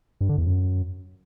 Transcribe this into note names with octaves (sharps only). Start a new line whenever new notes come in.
G2
D3
E2
F#2